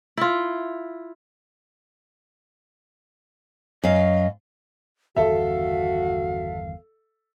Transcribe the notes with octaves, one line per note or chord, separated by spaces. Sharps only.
E4 F4
F#2 D#5 F5
G1 E2 D#3 F#4 A4 E5 F5